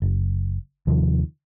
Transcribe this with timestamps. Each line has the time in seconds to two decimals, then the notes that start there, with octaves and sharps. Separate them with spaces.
0.02 F#1
0.87 D#2 C3 D#3 F3